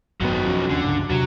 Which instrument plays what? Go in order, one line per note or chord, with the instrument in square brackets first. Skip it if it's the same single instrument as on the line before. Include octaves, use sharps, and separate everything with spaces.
[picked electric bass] G#1 F#2 B3 [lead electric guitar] D#3 F#3
[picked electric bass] F2 F3 C#4
[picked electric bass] D#2 C#4 [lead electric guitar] D3
[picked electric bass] C#2 G2 C#3
[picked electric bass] E2 C3 [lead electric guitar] F#3